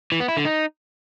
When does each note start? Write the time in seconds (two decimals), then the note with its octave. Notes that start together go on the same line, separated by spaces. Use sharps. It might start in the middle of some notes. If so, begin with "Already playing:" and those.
0.12 E3
0.20 B3
0.28 E4
0.37 D3
0.45 D#4